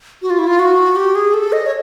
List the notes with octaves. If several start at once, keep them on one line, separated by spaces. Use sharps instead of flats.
F#4
F4
E4
F4
F#4
G4
G#4
A4
D#5
C#5